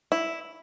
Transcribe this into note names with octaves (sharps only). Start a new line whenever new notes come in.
E4